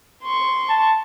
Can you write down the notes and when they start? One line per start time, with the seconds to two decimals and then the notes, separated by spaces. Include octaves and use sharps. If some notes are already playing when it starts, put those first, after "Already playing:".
0.23 C6 C#6
0.69 A5